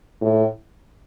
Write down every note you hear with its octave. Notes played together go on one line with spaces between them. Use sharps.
A2